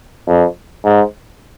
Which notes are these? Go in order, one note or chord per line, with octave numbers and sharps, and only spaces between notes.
F2
G#2